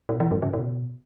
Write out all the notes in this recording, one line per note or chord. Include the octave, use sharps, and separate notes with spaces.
B2
E3
G2
C#3
B2